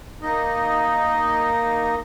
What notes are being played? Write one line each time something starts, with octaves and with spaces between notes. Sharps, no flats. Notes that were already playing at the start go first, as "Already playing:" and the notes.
A#3 D#4 D#5